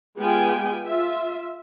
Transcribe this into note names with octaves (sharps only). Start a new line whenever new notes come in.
G#3 B3 F4 G4 G5 G#5
F4 E5